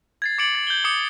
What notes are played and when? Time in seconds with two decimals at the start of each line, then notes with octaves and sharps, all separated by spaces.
0.22 G#6 A6 C7
0.38 D6 A6 C#7 D7 F#7
0.55 A6
0.67 G6 G7
0.84 D6 D#6 C#7